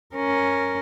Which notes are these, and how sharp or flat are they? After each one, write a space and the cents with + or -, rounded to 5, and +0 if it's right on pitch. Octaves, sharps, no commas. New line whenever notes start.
C#4 +0 A#4 +0